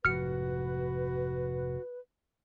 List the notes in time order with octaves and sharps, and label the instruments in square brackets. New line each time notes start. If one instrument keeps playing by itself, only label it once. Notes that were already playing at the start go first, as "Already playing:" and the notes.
[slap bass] F1 G#2 F3 [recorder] F#4 [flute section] B4 [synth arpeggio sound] F6 C#7